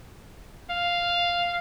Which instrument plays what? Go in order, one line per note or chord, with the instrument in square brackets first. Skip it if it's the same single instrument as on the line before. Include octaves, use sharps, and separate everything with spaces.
[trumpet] F5